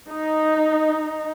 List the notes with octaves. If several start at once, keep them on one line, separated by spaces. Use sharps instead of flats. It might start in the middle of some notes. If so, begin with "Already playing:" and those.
D#4